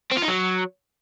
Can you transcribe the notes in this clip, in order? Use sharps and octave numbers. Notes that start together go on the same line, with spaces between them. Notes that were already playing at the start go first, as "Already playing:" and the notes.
C4
F4
D#4
F#3